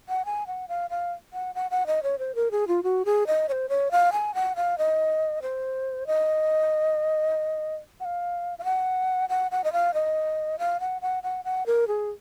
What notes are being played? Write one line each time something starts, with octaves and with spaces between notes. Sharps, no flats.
F#5
G#5
F#5
F5
F5
F#5
F#5
F#5
D#5
C#5
C5
A#4
G#4
F4
F#4
G#4
D#5
C#5
C5
C#5
F5
G#5
F#5
F5
D#5
C5
D#5
F#5
F5
F5
F#5
F#5
F#5
D#5
F5
D#5
F5
F#5
F#5
F#5
F#5
A#4
G#4